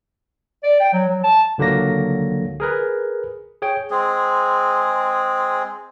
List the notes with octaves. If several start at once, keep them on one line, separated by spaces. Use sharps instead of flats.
D5
G5
F#3
F#3
A5
C#2 D3 F#3 A#3 A#6
G#4 A#4 B4
G#4 C#5 G5
G#3 C4 G#4